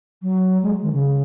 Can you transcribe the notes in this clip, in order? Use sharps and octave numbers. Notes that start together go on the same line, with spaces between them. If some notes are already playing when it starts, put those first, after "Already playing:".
F#3
G#3
D#3
C#3